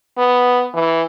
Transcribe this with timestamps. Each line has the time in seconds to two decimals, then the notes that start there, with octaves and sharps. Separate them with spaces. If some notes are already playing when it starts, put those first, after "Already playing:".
0.18 B3
0.74 E3